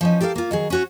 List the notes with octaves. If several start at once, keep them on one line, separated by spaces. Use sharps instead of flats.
F3 C#4 D#4
G4 A4 A#4 C#5 F5
A#3 F4
D#3 F#3 G#4
C#4 F#4 C#5